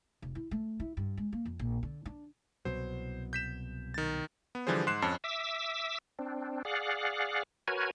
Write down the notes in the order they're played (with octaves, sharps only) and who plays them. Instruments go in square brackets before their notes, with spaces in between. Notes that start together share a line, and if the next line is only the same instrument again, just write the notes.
[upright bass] F1
E4
A3
E4
G2
G#3
A#3
F2
A#1
D3
D4
[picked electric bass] C2 B2 F#3 [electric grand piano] C5
[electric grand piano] G6 B6 E7
D#3 A6
B3
D3 E3 F3 G3 G#4 C5
G#2 C6 F#6 C7 E7
F2 C#4 A5
[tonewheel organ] E5 D6 E6
C4 D4
G#4 D5 F5 F#5
F#4 A#4 B4 C#5 G#5